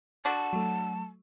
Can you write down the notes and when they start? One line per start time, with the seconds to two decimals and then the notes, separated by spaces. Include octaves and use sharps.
0.25 D3 D4 F#4 A5
0.53 F#3 A3